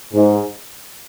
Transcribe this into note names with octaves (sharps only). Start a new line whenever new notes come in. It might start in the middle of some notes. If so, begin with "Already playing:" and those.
G#2